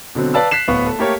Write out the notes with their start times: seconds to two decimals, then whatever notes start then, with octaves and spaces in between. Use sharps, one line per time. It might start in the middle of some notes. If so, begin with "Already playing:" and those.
0.15 B2 D3 F#3 C4
0.34 B4 D5 F5 A5 B5 E6
0.51 F#6 B6 C7 E7
0.68 D1 B3 F5 C#6
0.86 A4
0.99 A3 A#3 G4 A4 A#4 C#5